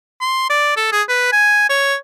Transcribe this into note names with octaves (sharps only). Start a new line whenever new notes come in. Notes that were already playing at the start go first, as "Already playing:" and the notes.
C6
D5
A4
G#4
B4
G#5
C#5